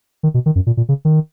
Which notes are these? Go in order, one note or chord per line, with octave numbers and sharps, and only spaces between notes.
D#3
B2
D#3
F#2
A#2
A#2
C#3
D#3